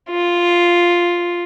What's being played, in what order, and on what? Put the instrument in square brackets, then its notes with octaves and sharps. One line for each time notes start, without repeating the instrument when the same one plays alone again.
[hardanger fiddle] F4